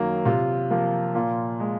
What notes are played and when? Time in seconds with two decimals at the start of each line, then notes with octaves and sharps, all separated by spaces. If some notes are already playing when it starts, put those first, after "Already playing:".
Already playing: F#2 D#3 F#3 A#3
0.25 C3 F4
0.70 F3 A#3
1.15 A#2 F4
1.60 G#3